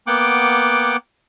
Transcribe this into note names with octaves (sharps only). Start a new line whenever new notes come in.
A#3 B3 F#5 G5 D6